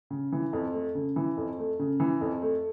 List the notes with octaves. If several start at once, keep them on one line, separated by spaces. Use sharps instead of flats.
C#3
E3
F2
A3
C#3
E3
F2
A3
C#3
E3
F2
A3